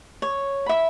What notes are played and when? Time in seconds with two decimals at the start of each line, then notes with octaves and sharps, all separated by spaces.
0.22 C#5
0.66 E5 B5